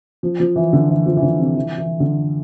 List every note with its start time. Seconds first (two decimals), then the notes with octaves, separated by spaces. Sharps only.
0.23 F3
0.40 F3
0.56 E3
0.73 D3
0.89 E3
1.06 F3
1.17 E3
1.22 D3
1.39 C3
1.56 E3
1.78 E3
2.00 D3